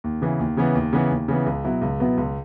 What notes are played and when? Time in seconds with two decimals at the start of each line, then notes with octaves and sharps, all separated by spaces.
0.04 D#2
0.22 C#3 E3 B3
0.39 D#2
0.57 C#3 E3 B3
0.75 D#2
0.93 C#3 E3 B3
1.11 D#2
1.28 C#3 E3 B3
1.46 C#2
1.64 B2 F#3 B3 E4
1.81 C#2
2.00 B2 F#3 B3 E4
2.17 C#2